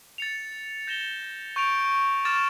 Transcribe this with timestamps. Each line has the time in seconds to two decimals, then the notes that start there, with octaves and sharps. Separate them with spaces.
0.18 A6 C#7 F7
0.87 G6 A#6 E7 G7
1.56 C#6 G6 D7 F7
2.25 D6 F6 A6 E7